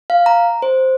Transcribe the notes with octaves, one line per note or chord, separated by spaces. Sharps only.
F5
A#5
C5